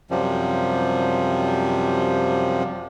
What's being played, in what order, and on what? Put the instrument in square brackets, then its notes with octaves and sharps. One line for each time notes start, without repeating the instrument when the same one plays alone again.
[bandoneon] F#2 C3 F3 G3